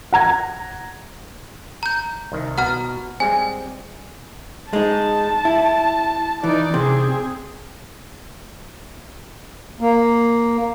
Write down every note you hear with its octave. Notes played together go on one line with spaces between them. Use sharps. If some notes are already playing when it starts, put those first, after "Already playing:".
F#5 A#5 G#6
A#5 G6
C2 D#3
B2 F#5 A#5 F6
G3 G#3 C4 G#5
G#3 D#4 A5
E4
E3 D#4 D5
C3 C4 G#4
A#3